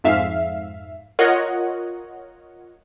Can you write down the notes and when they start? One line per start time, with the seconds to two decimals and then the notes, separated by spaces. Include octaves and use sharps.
0.04 F2 G#2 E5 F5
1.19 F4 A#4 C#5 D#5 F#5